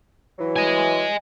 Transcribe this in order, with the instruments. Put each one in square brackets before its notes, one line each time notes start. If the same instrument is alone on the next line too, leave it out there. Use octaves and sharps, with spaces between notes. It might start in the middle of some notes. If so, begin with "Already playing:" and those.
[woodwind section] E3 F#3
[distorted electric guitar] D#5 G#5